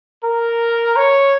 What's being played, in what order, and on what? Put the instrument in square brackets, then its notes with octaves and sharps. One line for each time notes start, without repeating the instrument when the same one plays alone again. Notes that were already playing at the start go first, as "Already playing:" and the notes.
[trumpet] A#4
C#5